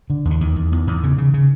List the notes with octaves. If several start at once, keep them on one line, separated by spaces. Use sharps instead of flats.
D3
D#2
D3
E2 D#3
E2
E2
E2
C#3
C#3
C#3